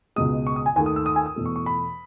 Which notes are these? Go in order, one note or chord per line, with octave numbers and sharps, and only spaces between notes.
C#2 B2 G#3 D#6
C#6
D#6
G#5
D#2 D#3 A3 G#5
D#6
E6
D#6
G#5
D#6
E2 B2 A3
C#6
C#6
B5